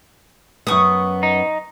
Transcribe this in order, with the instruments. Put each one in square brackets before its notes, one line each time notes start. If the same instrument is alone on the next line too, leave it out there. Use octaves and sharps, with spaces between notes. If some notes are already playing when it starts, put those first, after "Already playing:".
[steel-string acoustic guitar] F#2 B3 [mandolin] C#6 D#6
[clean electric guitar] D#4